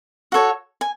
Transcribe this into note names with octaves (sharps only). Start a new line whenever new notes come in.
F#4 A4 C#5
G#5